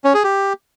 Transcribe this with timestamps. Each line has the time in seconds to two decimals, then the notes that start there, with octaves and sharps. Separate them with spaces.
0.04 C#4
0.14 G#4
0.24 G4